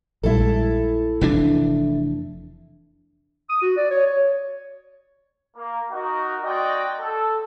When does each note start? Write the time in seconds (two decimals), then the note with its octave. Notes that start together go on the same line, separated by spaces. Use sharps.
0.23 A#1 G3 G#3 E4 A4
1.21 F1 E3 D4
3.49 D#6
3.62 F#4
3.77 D5
3.91 C#5
4.06 C#5
5.57 A#3
5.92 D#4 F#4 A#4
6.44 A#3 C4 F#4 D5 D#5 G5
7.00 A4